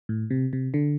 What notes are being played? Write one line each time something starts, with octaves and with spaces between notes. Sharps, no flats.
A2
C3
C3
D3